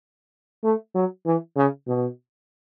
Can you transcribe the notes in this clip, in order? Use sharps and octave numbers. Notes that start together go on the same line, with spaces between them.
A3
F#3
E3
C#3
B2